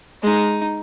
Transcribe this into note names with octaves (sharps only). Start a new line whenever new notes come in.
G#3 D#4